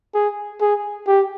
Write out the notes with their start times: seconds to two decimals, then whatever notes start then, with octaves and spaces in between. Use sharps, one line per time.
0.14 G#4
0.61 G#4
1.07 G4